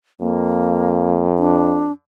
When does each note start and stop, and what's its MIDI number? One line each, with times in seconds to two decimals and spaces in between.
0.21 1.89 41
0.21 1.26 58
1.39 1.92 62